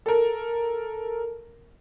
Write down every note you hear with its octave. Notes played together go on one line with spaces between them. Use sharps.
A4 A#4